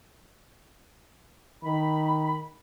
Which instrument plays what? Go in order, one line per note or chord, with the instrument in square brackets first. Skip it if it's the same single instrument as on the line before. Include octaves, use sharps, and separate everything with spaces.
[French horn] D#3 [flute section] B5